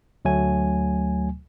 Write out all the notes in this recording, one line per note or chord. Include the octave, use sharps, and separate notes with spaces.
D2 F#3 A3 G#5